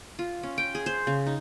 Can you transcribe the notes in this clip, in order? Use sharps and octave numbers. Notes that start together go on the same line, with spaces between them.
F4
C#4
G5
G#4
C5
C#3
D#4